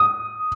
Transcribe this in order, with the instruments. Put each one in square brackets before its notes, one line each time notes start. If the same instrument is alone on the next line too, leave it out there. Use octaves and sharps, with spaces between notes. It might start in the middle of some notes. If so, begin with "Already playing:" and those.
Already playing: [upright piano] D#6